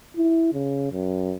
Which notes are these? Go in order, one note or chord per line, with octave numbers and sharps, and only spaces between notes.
E4
C#3
F#2